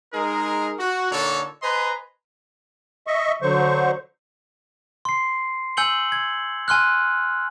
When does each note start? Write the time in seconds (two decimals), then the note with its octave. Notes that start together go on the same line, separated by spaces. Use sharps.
0.13 G#3 D#4 G#4 A#4
0.79 F#4
1.11 A#2 D3 D4 D#4 A4 C#5
1.62 B4 C5 D#5 G#5 A#5 C6
3.07 D#5 E5 C#6
3.42 D3 F#3 C5 C#6
5.05 C6 C7
5.77 G#5 E6 G6 C#7 F#7 G7
6.12 G#6
6.68 G#5 C6 F6 F#6